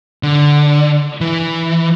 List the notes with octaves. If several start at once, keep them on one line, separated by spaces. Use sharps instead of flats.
D3
E3